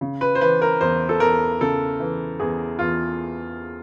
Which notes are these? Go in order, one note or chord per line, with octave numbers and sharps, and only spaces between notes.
C#3
B4
C5
E3 B4
A#4
E2 C5
A4
E2 A#4
C#3 A4
E3
E2 G#4
E2 F4